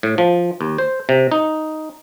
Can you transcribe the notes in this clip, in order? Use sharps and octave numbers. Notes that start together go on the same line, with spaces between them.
A2
F3
D#2
C5
C3
D#4